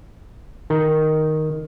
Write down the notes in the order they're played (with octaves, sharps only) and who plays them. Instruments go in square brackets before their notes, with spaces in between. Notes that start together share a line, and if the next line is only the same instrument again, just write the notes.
[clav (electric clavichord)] D#3